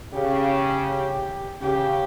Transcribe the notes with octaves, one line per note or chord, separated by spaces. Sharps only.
C#3 G4
C#3 G4